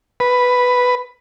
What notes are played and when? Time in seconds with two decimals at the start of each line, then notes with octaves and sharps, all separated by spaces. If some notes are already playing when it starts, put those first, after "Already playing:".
0.20 B4